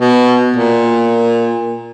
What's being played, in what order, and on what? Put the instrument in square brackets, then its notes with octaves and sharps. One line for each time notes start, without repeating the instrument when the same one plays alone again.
[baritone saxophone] B2
A#2